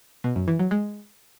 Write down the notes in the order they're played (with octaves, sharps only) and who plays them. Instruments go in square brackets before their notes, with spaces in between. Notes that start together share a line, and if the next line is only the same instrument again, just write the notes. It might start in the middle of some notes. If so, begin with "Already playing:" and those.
[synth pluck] B2
F#2
E3
F#3
G#3